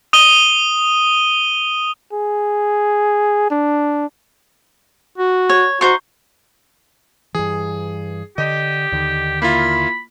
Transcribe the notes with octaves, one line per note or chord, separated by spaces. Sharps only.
D#6 D#7 G7
G#4
D4
F#4
C#5
D#4 F#4 C5 C#6
G2 E3 G#4
D3 G4 D#5
D#2 D3 D#3
A#3 E4 F4 B5